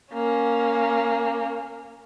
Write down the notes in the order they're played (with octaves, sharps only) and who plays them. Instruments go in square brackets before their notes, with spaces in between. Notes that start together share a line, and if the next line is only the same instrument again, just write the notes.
[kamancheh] A#3 C#4